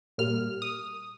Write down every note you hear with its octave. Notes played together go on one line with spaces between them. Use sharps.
A#2 G3 A#3 F6
D#6